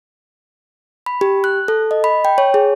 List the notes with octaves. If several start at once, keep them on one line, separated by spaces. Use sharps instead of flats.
B5
G4
F#6
A4
D#5
B5
G5
C#5
G#4